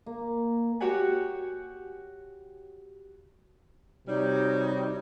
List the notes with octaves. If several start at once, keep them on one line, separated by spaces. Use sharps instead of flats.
A#3
F#4 G4 C#5 F#5 G#5
C3 G3 D#4 F#4 C#5